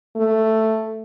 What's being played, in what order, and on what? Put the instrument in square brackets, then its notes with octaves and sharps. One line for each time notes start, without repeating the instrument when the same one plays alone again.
[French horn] A3